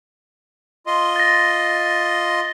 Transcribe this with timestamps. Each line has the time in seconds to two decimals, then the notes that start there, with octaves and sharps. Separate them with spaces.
0.87 F4 D#5 C6
1.16 A6 A#6